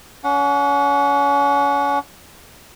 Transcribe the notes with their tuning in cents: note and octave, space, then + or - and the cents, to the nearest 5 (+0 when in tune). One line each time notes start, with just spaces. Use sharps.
C#4 +35 F#5 -20